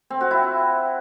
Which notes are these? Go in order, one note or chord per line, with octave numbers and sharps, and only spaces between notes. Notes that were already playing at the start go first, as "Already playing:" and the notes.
C4
F#4
E4